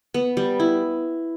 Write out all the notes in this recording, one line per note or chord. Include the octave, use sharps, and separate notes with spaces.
B3
G3
E4